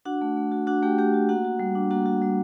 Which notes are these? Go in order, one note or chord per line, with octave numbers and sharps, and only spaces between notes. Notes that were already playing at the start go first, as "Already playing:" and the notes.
D4 F#4 F#5
A3
A3
F#4
D4 F#4 F#5
A3 G4 G5
A3 G4 G5
F#4
A#3 F#4 F#5
F#4
G3
D4
A#3 F#4 F#5
F#4
G3